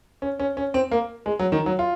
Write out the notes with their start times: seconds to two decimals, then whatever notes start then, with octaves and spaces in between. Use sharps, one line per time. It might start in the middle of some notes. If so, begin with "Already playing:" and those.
0.22 C#4
0.40 C#4
0.57 C#4
0.74 C4
0.91 A#3
1.26 G#3
1.39 F#3
1.52 D#3
1.66 F#3
1.79 F4